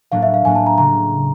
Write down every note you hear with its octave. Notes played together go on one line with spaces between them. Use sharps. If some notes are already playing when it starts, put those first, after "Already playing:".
A2 F#3 A#3 D4 F5
E5
F5
A2 F#3 A#3 D4 G#5
A5
A#5
C#3 F#3 A#5